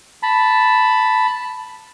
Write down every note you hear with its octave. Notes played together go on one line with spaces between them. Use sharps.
A5 B5